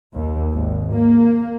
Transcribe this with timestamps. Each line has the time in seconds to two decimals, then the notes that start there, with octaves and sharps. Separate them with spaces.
0.13 D#2
0.54 G#1
0.93 A#3